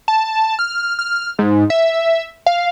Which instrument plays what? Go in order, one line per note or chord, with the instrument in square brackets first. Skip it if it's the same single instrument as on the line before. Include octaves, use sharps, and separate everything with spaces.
[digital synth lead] A5
F6
F6
G#2
E5
F5